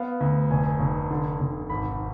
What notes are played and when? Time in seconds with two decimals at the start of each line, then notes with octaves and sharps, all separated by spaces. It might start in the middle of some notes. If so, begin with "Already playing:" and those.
Already playing: B3 F5
0.20 D2
0.50 F1 G#5
0.80 F1
1.11 D3
1.40 F1
1.70 G#1 B5